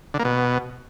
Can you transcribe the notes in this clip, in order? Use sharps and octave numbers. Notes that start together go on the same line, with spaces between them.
D3
A#3
B2